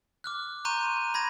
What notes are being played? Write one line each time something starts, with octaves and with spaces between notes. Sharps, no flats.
D6 F6 F#6
A#5 C6 C#6 F#6 G6 D#7
B5 G#6 A#6 D#7